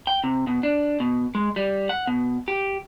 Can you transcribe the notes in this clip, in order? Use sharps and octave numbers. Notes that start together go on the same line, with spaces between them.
G5
C3
B2
D4
B2
G#3
G3
F#5
B2
G4